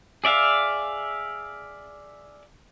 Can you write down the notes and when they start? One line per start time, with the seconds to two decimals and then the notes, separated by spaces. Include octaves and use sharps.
0.24 G#4 D5 E5 F5